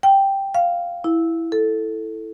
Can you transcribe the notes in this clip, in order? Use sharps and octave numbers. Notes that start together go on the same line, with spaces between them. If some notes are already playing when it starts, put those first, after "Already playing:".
G5
F5
E4
A4